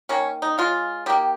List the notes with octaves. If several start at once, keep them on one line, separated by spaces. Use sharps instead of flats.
D#3 A#3 C#4
D#4
C#3 G#3 F4
D#3 A#3 G4